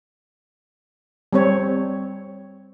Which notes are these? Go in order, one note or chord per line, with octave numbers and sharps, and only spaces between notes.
G3 C4 C#5